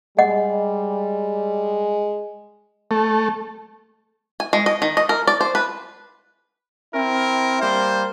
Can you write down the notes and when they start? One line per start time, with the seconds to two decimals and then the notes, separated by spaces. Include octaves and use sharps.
0.18 G3 G#3 D#5 F#5
2.91 A3
4.40 G#5
4.53 G#3
4.66 D#5
4.82 D#3
4.97 D#5
5.09 A#4
5.27 D5
5.41 C5
5.55 B4
6.93 C4 E4 A#4
7.61 G3 A#3 C5